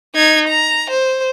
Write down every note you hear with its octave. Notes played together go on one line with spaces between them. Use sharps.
D#4 G#6
A#5
C5